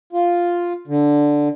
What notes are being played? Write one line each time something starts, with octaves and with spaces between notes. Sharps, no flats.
F4
D3